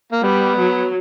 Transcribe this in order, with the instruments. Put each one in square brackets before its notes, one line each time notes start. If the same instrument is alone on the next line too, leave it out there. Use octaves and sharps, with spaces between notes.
[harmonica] A#3
[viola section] G3 [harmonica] B3
[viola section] F#3